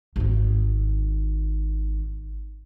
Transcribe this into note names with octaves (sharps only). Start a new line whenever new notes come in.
G#1 D#3